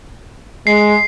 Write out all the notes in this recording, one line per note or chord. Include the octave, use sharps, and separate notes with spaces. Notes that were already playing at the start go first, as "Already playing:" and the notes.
G#3 C7